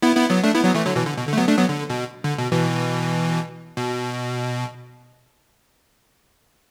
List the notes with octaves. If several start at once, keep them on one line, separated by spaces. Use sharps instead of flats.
B3 E4
B3 E4
F#3 B3
A3 D4
B3 E4
F#3 B3
E3 A3
D3 F#3
B2 E3
D3
B2
D3
A3
F#3 B3
A3 D4
F#3 B3
D3
B2
D3
B2
B2 E3
B2